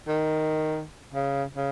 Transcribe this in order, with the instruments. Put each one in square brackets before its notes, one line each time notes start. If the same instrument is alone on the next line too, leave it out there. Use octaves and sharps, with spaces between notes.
[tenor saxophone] D#3
C#3
C#3